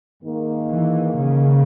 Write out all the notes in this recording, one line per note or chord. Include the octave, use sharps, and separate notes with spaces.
G#2 D#3 A#3
E3
C#3